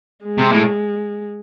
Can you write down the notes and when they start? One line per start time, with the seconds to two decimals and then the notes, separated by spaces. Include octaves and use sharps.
0.25 G#3
0.38 C3
0.53 A2